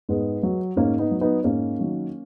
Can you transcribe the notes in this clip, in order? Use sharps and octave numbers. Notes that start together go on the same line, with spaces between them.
G#2 G#3 B3
F#3
G#2 A#3 C#4
B3 D#4
F#3
B3 D#4
G#2 A#3 C#4
D#3 F#3